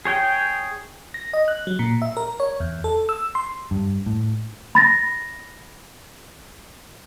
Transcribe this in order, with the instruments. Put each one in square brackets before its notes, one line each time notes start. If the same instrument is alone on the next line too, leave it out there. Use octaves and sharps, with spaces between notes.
[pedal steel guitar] G#4 C#5 G5
[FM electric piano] A#6
D#5
F#6
F#3
A#2
E5
A#4
C#5
E2
A4
E6
C6
[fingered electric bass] G2
A2
[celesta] B5 A6 A#6